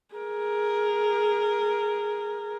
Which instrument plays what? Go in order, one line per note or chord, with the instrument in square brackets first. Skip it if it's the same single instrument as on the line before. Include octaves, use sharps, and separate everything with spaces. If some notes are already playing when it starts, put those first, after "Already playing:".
[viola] G#4 A#4